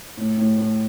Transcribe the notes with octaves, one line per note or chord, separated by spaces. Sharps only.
A2
A2
A2